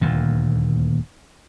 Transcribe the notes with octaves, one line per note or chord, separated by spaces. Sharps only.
D#1 D2 A#2